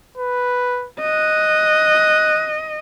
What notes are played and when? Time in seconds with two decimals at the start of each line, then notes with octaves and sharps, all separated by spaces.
0.18 B4
1.02 D#5 F#6